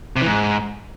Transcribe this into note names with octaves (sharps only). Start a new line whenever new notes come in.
C3
E3
G#2